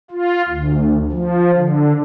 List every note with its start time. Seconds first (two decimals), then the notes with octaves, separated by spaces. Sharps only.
0.11 F4
0.49 D2
1.12 F3
1.56 D3